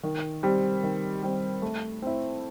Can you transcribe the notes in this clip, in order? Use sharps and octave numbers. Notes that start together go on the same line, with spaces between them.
D#3
G3 C4
D#3
G3 C4
A3
C4 E4